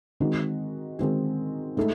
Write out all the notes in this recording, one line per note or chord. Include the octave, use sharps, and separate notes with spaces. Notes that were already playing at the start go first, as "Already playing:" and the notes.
D#3 G#3 C4 D#4 F#4
D#3 G#3 C4 D#4 F#4
A2 G#3 D#4 A4